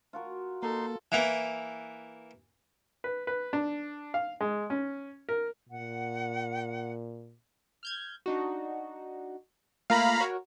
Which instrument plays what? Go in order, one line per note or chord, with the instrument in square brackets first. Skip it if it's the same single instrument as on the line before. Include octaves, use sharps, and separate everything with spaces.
[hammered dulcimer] F4 F#4 A#4
[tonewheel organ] A#3 [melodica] D#4 C6 [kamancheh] A4
[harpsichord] E3 A#3
[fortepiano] B4
B4
D4
F5
G#3
C#4
A#4
[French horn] A#2 [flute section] F#5
[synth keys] F6 G6 G#6
D4 D#4 F#4
[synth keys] A3 A#3 F4 [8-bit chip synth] F5 A#5 B5
[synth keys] F#4 A#4 C#5